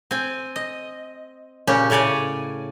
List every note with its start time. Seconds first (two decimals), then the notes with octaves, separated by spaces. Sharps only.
0.11 C4 G#5
0.56 D#5
1.67 A#2 C#3 C#4 G4
1.90 A2 C#3 C#5 D5 G#5